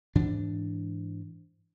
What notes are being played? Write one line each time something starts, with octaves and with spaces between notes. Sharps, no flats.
G#2 E3 D4